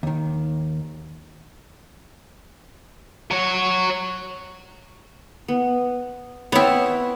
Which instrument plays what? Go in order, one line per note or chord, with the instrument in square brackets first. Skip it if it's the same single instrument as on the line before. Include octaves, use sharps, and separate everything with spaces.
[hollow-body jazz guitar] D#2 D#3
[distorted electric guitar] F#3 C#5
[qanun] B3
[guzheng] B3 E4 [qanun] C4 C#5